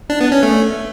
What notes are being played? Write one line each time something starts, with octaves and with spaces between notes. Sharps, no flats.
D4
B3
C#4
A3